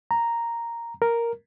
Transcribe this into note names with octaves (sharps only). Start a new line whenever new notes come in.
A#5
A#4